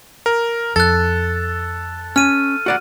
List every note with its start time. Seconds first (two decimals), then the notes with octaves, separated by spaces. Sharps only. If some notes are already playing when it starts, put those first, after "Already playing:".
0.26 A#4
0.76 F2 A4 F#6 A6
2.16 C#4 F6 D#7
2.66 F#4 D5 F#5